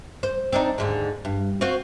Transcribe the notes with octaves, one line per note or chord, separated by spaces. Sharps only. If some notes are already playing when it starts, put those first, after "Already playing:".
C5
C4 D4 D#4
D#2 G#2 D3
G2
C4 F4 F#4